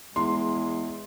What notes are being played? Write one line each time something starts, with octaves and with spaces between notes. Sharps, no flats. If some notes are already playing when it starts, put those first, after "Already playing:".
E2 G#3 C6